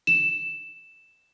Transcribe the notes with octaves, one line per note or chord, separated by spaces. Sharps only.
E7